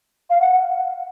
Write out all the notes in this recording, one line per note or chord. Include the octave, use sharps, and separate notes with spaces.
F5
F#5